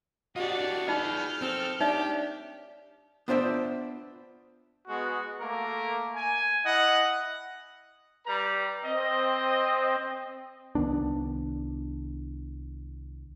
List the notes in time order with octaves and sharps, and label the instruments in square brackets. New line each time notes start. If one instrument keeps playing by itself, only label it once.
[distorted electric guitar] D4 D#5 [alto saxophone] F#4 [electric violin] G4 D5
[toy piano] D#4 F4 D5 [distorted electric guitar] G#4 B4 [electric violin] F6 G6
[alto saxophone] C4 [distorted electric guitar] A4
[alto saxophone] D4 [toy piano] D#4 C#5 E5 [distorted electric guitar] G4
[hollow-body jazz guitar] B3 D4 F4 C5 D5 E5
[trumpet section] G#3 B3 F#4
A3 A#3 A#4
G#5
E4 D#5 F#5
G3 B4 A#5
[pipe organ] C4 [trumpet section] D#5
[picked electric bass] C2 D#3 B3 D4